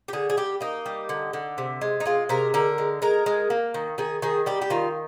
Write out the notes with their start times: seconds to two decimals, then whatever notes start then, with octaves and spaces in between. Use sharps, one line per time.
0.08 G4
0.13 D3 G#4
0.30 G#4
0.37 G3 G4
0.61 A#3 D#4
0.86 G3
1.09 D3
1.33 D3
1.58 C3
1.81 G#3
2.00 D#4
2.06 G#3 F4
2.29 C3 A#4
2.54 D3 A#4
2.78 G#3
3.02 G#3 A#4
3.26 G#3
3.50 A#3
3.74 D#3
3.98 D#3 G#4
4.22 D#3 G#4
4.46 G3 G4
4.62 G4
4.70 D#3 F4